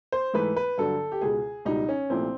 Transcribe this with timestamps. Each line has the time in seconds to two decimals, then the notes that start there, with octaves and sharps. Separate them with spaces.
0.12 C5
0.34 G#2 E3 A3 B4
0.56 B4
0.78 G2 D3 F#3 A4
1.12 G4
1.21 C#2 B2 G#3 G#4
1.65 C#2 B2 G3 D#4
1.89 C#4
2.10 C2 A#2 F3 A3 C4